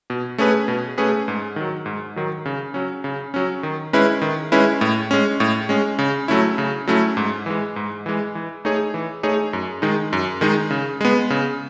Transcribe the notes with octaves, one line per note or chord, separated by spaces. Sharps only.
B2
A3 C#4 G#4 B4
B2
A3 C#4 G#4 B4
G#2
D#3 F#3
G#2
D#3 F#3
C#3
F#3 C#4
C#3
F#3 C#4
D#3
G#3 C#4 E4 B4
D#3
G#3 C#4 E4 B4
A2
G#3 C#4
A2
G#3 C#4
C#3
F#3 A3 C#4 E4
C#3
F#3 A3 C#4 E4
G#2
E3 G#3
G#2
E3 G#3
E3
A3 D#4 G#4 C#5
E3
A3 D#4 G#4 C#5
F#2
D#3 G#3 D#4
F#2
D#3 G#3 D#4
C#3
G#3 B3
C#3